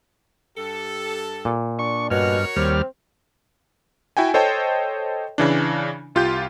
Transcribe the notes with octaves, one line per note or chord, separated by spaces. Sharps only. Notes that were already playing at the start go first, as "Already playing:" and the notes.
G2 G4 A4
A#2
D4 C#6
G2 B2 F#4 A#4 C#5 F6
D#2 G3 C4 F6
E4 F#4 G5 G#5
A4 C5 C#5 D#5 G5 A5
C#3 E3 D4
C2 F4 G4 G6